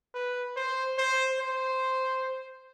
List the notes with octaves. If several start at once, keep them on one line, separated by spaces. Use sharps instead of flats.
B4
C5
C5
C5